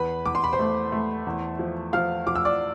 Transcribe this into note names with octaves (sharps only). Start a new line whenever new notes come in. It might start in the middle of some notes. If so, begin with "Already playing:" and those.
Already playing: E2 B4 B5
E2 D6
C6
B5
C5 C6
A3
A3
E2
F3
F3 F5 F6
F3 D6
E6
D5 D6